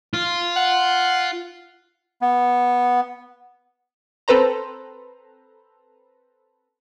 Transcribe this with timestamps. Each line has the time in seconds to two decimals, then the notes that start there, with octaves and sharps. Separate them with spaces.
0.14 F4
0.56 F#5
2.22 B3
4.28 C4 A4 B4 C5 A#5